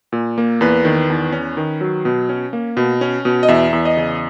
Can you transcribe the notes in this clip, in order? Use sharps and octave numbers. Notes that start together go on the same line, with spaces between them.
A#2
A#3
E2 B4
D#3
E2
C#4
D#3
F#3
B2
C#4
A#3
B2
C#4
B2
D#5
E2 E5
E2
D#5
C#3